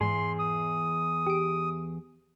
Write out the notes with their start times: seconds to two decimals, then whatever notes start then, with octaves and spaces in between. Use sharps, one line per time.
0.01 E2 G#2 G#4 C6
0.39 D#6
1.27 G4 D7